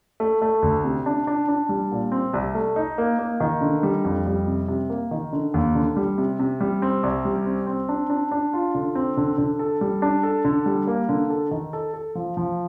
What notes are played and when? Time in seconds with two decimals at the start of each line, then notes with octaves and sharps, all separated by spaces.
0.20 A3
0.42 A3
0.63 D2
0.84 C3
1.06 D4
1.27 D4
1.49 D4
1.69 G3
1.92 A#2
2.12 C4
2.33 C2
2.55 A3
2.76 D#4
2.98 A#3
3.19 A#3
3.40 D#3
3.61 D3
3.83 G3
4.04 F2
4.26 G3
4.47 C3
4.68 C3
4.90 A#3
5.11 D#3
5.33 D3
5.54 D#2
5.75 D3
5.97 G3
6.18 C3
6.39 C3
6.61 G3
6.82 C4
7.03 C2
7.25 G3
7.46 C4
7.67 C4
7.89 D4
8.10 D4
8.32 D4
8.53 F4
8.75 D3
8.95 C4
9.17 D3
9.38 D3
9.59 A4
9.81 G3
10.02 D4
10.23 A4
10.45 D3
10.66 G3
10.87 A#3
11.09 D3
11.30 A4
11.51 D#3
11.73 A4
11.94 A4
12.15 F3
12.37 F3